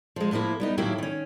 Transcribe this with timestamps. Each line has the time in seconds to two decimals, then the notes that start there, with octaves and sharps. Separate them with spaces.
0.16 F3 G#3
0.31 A2 F3 G3 A#3 E4
0.60 G3 B3 D#4
0.78 A2 D#3 F#3 A#3 E4 G4
0.98 D#3 C#4